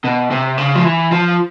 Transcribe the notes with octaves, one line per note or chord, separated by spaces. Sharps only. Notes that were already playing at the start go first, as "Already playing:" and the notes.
B2
C3
C#3
F3
E3
F3